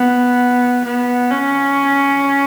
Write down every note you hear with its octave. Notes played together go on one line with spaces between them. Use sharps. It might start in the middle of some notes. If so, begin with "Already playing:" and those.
Already playing: B3
B3
C#4